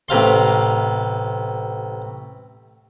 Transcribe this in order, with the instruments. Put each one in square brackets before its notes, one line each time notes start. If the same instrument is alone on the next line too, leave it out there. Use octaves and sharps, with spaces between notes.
[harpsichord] A1 C3 F5 C6